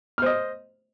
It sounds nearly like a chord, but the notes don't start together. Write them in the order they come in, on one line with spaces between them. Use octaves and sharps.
F6 C5 D#5